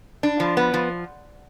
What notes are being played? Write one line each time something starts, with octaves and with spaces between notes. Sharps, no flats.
D4
F3
B3
F3